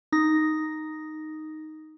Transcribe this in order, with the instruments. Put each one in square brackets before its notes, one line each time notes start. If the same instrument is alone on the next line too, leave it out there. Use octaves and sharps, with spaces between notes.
[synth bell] D#4 D#6 A#6